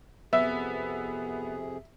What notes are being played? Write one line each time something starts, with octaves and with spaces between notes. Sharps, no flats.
F2 C3 B3 G#4 E5